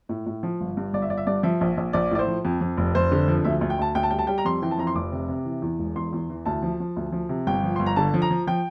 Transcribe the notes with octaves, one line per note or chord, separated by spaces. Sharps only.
A2
A2
F3
G1
G2
G1 D5
E5
G1 D5
E5
G2 D5
F3 E5
A#1
A#1
A#1 D5
A2 D5
C5
F3
F2
F2
F1
F1 C5
D3
F3
D2 E5
D2
G5
D2 A5
D2 G5
A5
G3 G5
A5
G3 G5
A#5
F2 C6
E3 G5
A5
F2 A#5
C6
F1 D6
C3
C3
E3
E2
E1
E2 C6
E2
E3
D2 A5
F3
F3
D2
F3
C3
G1 G5
F3
G1 C6
A#5
D3 A5
F3
A#5
F3
F3 G5